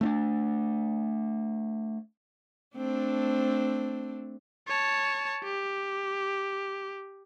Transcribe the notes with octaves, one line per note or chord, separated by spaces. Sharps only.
A3 C4 D4
A3 C4 D4
C#5 A5
G4